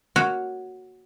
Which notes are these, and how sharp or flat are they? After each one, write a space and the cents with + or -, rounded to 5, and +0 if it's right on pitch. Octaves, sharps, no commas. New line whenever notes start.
A#3 +0 F#4 +0 C#5 +0